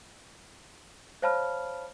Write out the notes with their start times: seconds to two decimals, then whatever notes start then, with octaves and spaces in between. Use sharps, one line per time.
1.22 C5 C#5 F5 A5 B5 F6